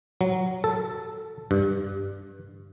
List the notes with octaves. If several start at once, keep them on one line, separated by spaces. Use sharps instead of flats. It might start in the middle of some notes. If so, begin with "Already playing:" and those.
F#3
A4
G2